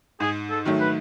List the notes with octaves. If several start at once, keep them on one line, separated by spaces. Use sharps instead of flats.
G#2 G#4
A4
D#3 F#3 A3
B4